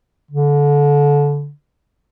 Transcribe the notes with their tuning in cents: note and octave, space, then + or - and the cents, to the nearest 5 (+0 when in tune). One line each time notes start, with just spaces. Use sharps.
D3 -25